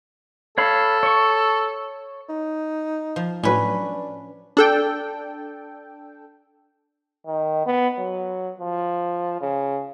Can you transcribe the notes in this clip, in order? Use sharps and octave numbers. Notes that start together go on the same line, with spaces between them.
A4 C#5 F5 B5
C#5 C#6
D#4
F3
A2 F#3 C#4 D4 B4
D4 A4 G5
D#3
B3
F#3
F3
C#3